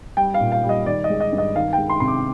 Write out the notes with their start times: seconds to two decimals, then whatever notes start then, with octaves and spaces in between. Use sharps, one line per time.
0.17 G3 G5
0.34 F5
0.40 A#2
0.52 F5
0.64 G3
0.69 D#5
0.86 D#3 D5
1.04 D#5
1.10 G#3
1.20 D#5
1.32 G2
1.38 D#5
1.55 D#3 F5
1.73 G5
1.78 G#3
1.90 C6
2.00 C3 C6
2.08 D6